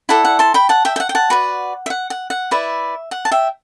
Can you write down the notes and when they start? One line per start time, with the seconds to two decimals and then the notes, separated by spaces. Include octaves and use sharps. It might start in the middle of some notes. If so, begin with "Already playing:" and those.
0.09 E4 A4 D5 F#5
0.25 F#5
0.39 A5 C6
0.54 G5 B5
0.69 F#5 A5
0.85 E5 G5
0.96 G5
1.00 F#5
1.09 G5
1.15 F#5 A5
1.30 F#4 B4 D5
1.86 E5
1.90 F#5
2.10 F#5
2.30 F#5
2.51 E4 B4 D5 E5
3.11 F#5
3.25 A5
3.31 E5 G5